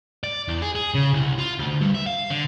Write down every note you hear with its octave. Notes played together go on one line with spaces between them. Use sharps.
D5
E2
G#4
G#4
C#3
C2
F4
D2
G2
E5
F5
D3